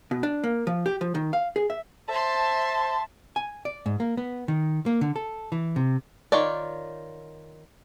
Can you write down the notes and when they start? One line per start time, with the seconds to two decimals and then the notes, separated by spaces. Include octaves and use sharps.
0.11 B2
0.23 D4
0.44 A#3
0.67 F3
0.86 G4
1.01 F3
1.15 D#3
1.33 F5
1.56 G#4
1.70 E5
2.09 C5 E5 A5 C6
3.36 G#5
3.65 D5
3.86 G#2
4.00 A#3
4.17 B3
4.48 D#3
4.86 A#3
5.01 D3
5.16 A4
5.52 E3
5.76 C3
6.32 D#3 F4 C#5 D5